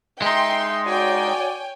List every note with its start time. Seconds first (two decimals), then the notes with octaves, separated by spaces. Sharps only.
0.22 G#3 D#4 E5 G5 C6
0.87 F#4 C#5 D5 G5 G#5